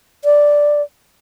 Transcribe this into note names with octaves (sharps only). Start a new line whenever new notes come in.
D5